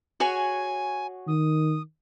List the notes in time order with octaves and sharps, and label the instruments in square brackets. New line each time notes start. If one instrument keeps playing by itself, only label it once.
[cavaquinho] F#4 G#4 C#5 [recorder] G#5
[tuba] D#3 [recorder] D#6